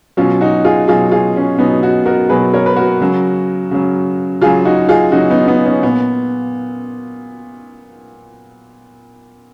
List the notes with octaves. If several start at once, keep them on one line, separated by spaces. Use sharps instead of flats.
B2 F#3 C#4 F4
D#4 F#4
F4 G#4
B2 F#3 F4 G#4
F4 G#4
C#4
B2 F#3 B3 D#4
D#4 F#4
F#4 A#4
B2 F#3 G#4 B4
A#4 C#5
B4
F#4 A#4
C#3 F#3
C#3 F#3
C#3 F#3 F4 G#4
D#4 F#4
F4 G#4
C#3 F#3 D#4 F#4
B3 D#4
B3 D#4
C#4
A#2 B3